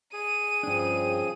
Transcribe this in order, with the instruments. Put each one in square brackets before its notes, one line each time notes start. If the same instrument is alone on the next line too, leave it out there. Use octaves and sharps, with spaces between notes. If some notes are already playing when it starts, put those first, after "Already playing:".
[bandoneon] G#4 [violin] D#7
[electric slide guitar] G2 D4 [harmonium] C#3 F3 C4